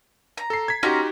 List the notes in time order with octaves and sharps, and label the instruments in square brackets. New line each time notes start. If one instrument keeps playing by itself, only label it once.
[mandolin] A#5
[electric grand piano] A4 C7
G#6 B6
[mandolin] C#4 A#5 C6 [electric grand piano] D#4 F#4 G4